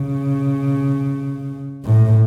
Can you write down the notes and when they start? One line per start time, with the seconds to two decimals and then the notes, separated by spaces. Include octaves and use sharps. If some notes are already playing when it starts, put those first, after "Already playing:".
Already playing: C#3
1.84 A2